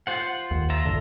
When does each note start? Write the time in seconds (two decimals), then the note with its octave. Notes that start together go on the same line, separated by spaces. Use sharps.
0.07 F4 C5 F#5
0.51 D#2
0.70 F4 E5 A#5
0.85 A1 G2 D3